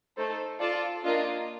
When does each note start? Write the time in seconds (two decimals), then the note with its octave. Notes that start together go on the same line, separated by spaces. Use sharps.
0.17 A3 D#4 A4 C5
0.60 F4 A4 D5 A5
1.04 A#3 D4 F4 A#4 D#5